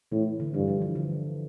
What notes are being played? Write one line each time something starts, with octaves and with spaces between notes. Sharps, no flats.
A2 E3
D3
G2 E3
F3
E3
D3